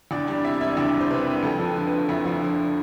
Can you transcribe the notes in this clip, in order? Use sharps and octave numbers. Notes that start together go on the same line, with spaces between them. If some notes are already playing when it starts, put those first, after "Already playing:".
E2 D4 D5
G3 D4 D5
C3 E4 E5
D5
E1 E4 E5
E2 D4 D5
G3
C5
C3 B4
E1
F2 A4
F3
B4
D3
F1 B4
F2 E4 E5
F3
D3